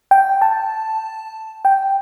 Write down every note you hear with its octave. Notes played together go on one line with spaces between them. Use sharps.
G5
A5
G5